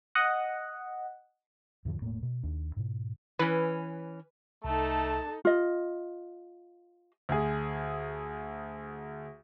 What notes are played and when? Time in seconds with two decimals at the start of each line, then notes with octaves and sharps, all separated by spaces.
0.15 D#5 F#5
1.85 E2 G#2 D3 F3
2.01 E1 A2 A3 A#3
2.23 B2
2.43 D#2 D4
2.76 G#2 B2
3.39 E3 C#4 B4
4.64 C2 A3 D#4 A4 A5
5.45 F4 D#5
7.29 D2 G#4